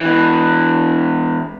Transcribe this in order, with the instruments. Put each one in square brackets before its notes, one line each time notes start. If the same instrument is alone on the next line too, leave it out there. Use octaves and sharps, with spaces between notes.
[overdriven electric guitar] B2 E3